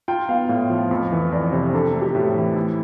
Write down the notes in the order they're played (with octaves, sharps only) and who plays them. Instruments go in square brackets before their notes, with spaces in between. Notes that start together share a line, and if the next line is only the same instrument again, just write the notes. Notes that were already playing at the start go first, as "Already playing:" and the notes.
[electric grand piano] F4 [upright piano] G5
[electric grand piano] B3 [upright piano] F5
[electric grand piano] A2
F3
F2
E3
[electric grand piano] F2 [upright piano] D5
[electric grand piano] C3
[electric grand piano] D4 [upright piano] A4
[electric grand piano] A3
[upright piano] G4
[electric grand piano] A2
E3
E4